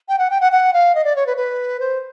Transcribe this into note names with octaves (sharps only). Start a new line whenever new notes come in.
G5
F#5
G5
F#5
F#5
F5
D#5
D5
C#5
B4
B4
C5